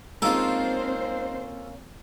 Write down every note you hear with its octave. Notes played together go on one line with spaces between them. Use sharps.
G#3 A#3 C4 C#4 D#4 F4 A4 C5